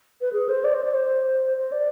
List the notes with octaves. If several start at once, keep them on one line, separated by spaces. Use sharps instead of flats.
B4
G#4
C5
D5
C5
D5
C5
C5
D5